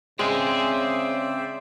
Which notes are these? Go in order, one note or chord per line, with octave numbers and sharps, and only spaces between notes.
C#3 G#3 C4 G#4 C5 D5 E5